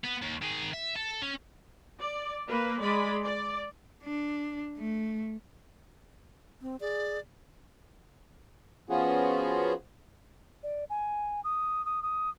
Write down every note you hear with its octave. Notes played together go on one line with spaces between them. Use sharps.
B3
D#2
D#3 G#4
E5
A4
C#4
D5
A#3 B4
G#3 D5 B5
D5
D4
A3
C4
G#4 D5
F3 B3 C#4 F4 F#4 G#4
D5
G#5
D#6
D#6
D#6